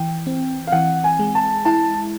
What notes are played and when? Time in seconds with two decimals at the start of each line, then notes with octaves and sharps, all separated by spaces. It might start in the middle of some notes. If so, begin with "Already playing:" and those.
Already playing: E3 G5
0.27 C4
0.67 F5
0.72 E3 F#5
1.04 G#5
1.19 G#3
1.35 A5
1.65 E4 A5